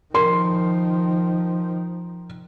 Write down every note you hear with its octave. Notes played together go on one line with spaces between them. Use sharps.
D#3 F3 A#4 C6